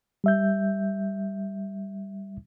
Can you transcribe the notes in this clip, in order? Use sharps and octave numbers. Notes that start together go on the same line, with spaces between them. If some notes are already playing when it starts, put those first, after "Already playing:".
G3 E5 G6